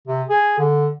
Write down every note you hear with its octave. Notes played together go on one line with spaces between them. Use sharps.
C3
G#4
D3